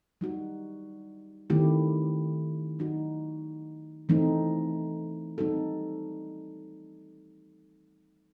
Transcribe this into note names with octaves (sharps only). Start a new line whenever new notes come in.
G3 D#4 F#4
D#3 A3 C4 E4 G4
A3 D#4 F#4
E3 A3 C4 D#4
G3 C4 D#4 F#4 A4